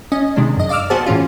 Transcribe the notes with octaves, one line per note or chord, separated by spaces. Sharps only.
C#4 D#5
C3 D#3 G#3 D4
F#2 D#5
D5 F5 D6 E6 F6
B3 F#4 G#4 C5 A5
A2 E3 C#4 F4